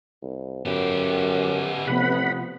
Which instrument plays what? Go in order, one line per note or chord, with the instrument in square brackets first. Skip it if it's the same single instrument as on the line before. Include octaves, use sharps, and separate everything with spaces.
[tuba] C2
[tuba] F#2 [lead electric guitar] B3 G4
[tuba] A1 [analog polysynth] C3 F3 B3 [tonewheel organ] F#5 B5